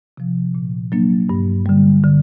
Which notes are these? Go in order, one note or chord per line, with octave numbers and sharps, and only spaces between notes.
C3 F3
A#2
F#3 A#3 D4
G2
D3 G3
D3